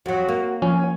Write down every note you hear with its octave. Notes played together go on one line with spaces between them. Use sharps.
F2 F#3 F#4
A#3
F3 C#4 C#5 G#5